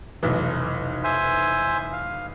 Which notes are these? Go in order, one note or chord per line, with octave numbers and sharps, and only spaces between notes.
F1 B1 E3
C5 E5 G#5
F5